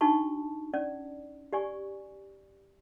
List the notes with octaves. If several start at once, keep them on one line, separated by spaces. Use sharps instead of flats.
D4 D#4 F#4 A5 C#6
C#4 D5
G4 D5 G#5 C#6